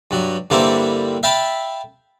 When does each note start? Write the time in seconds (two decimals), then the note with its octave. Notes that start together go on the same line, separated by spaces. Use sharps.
0.11 G2 F#3
0.50 G2 D3 G3 A#3 C4 E4
1.23 E5 F5 G5 A5 B5